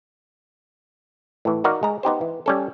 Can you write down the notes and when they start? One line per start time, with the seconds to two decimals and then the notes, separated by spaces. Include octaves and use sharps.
1.45 A2 E3
1.64 D#4 F#4 A#4 D5 F5
1.83 G#3 A#5
2.03 B3 D#4 G4 C5
2.21 E3
2.46 G3 C#4 A4